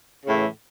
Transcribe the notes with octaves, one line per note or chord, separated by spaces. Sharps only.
A2 C#3 E3